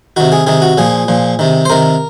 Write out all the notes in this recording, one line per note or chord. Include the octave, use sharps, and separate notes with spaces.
C3 D#3 F#4
G#4
C3 D#3 G#4
F#4
A#2 F3 G#4
A#2 F3
C3 D#3
C5
C3 D#3 A#4